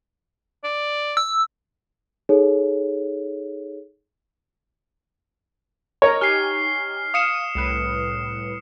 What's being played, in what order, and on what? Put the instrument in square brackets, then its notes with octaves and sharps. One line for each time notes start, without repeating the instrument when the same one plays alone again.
[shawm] D5
[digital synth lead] E6
[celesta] D#4 G#4 A4 C#5
[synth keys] A#4 D#5 A#5 [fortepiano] C#5
[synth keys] D#4 G4 G#5 [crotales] F6 C7
[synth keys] F5 F6 D#7 [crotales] D#6 C#7 E7
[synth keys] C2 A2 B4